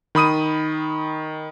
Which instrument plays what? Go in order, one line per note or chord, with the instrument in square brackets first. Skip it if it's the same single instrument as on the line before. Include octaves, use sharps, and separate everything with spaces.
[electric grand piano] D#3 B5 D#6 D#7